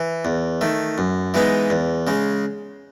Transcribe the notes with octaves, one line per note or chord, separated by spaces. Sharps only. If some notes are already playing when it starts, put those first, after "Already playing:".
Already playing: E3
E2
D#3 A3
F#2
E3 G#3 B3 D#4
E2
C#3 G#3